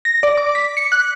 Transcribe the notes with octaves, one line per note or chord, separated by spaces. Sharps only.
A#6
D5
D6
B6
C#7
F#6